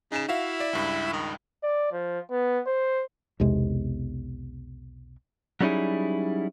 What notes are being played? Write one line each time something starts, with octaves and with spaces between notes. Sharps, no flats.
C#3 D#4 E7
E4 F#4 E5 F5
D5
C#2 G2 B5
D#3
D5
F3
B3
C5
B1 E2 C3 G#3
F#3 G3 C#4 D#4 E4 G#4